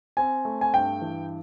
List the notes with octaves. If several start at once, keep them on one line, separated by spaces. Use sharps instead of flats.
C4 G#5
A3
G#5
G2 G5
E3